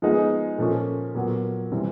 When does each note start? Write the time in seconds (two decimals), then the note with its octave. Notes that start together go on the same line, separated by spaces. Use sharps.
0.02 F3 G#3 B3 D#4 G#4
0.58 A#2 F3 A3 C#4
1.15 A#2 F#3 B3
1.72 C3 E3 G3 C4